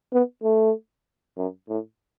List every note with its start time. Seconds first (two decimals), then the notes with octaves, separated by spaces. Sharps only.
0.13 B3
0.44 A3
1.37 F#2
1.69 A2